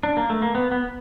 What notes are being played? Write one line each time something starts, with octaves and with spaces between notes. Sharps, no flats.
D4
A#3
A3
A#3
B3
B3